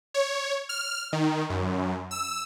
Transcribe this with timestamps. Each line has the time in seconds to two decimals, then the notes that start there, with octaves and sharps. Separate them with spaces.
0.14 C#5
0.69 F6
1.13 D#3
1.50 F#2
2.11 E6